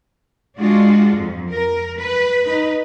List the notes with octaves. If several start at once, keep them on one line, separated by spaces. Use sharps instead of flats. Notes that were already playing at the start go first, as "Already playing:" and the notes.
G#3 D4 F4 F#4
F2
A#4
B4
D#4 B4